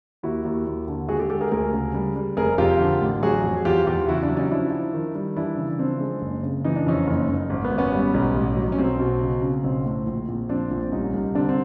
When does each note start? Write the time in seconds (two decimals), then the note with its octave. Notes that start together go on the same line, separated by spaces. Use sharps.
0.23 D#2 E4 F#4
0.45 D#2
0.67 D#2
0.88 D3
1.08 G#3 F#4 G#4
1.19 G4 A4
1.30 G#3 G4 A4
1.41 G#4 A#4
1.52 D2 G#4 A#4
1.73 C#3
1.94 G3
2.16 G3
2.37 F1 G#4 A#4
2.58 F2 F4 G4
2.80 D3
3.01 A1
3.23 F#3 F#4 G#4
3.44 F2
3.65 E2 F4 G4
3.87 E2 F4 G4
4.08 C#3 E4 F#4
4.23 D4 E4
4.30 F#3
4.37 C#4 D#4
4.51 F3 D4 E4
4.72 F3
4.94 D#3
5.15 G3
5.36 E3 D4 E4
5.57 C#3
5.79 F3 C4 D4
6.00 G#3
6.22 F#1
6.43 C#3
6.64 E3 D#4
6.76 D4
6.86 F2 C#4 D#4
7.07 F#1
7.29 F#1
7.50 G#1
7.65 B3
7.72 G#1
7.78 B3 C#4
7.92 G3
8.14 B1
8.35 A1
8.57 F#3
8.72 C#4
8.78 B1 C4
9.00 B2
9.21 C#3
9.42 C#3
9.64 B1 C4
9.86 A2
10.06 A#1
10.28 A#1
10.49 F3 C4 D4
10.71 A#1
10.92 C2 C#4 D#4
11.13 C2
11.35 D3 C4 D4
11.49 C4